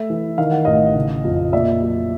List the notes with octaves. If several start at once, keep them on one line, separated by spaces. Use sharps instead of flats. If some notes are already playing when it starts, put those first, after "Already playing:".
Already playing: A3 E5
E3
D#3 F5
F#5
A1 D#5 F5
C#3
F2
A#2 D5 E5
F#3